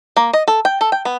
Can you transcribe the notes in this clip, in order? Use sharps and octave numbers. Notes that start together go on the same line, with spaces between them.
A#3
D#5
A4
G5
A4
G5
B3